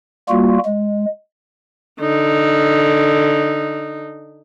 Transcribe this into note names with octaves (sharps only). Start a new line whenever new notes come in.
G3 A#3 F4 F#4
G#3
D3 D#4